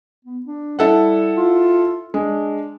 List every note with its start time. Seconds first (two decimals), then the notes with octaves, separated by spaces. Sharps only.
0.25 B3
0.46 D4
0.79 G3 E4 A4 F#5
1.36 F4
2.14 G#3 D4